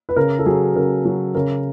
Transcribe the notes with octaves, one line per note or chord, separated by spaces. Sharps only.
B4
C#3 A#4
A4
F#3 G#4
C#3 A#4
F#3
C#3 A#4